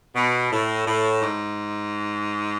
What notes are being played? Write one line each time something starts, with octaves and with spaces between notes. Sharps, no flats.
B2
A2
A2
G#2